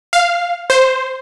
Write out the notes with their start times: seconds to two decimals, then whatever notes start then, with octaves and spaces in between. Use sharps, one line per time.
0.13 F5
0.70 C5